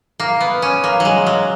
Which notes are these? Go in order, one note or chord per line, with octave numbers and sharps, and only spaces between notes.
A#3
B3
C#4
A#3
F#3 G#3
F#3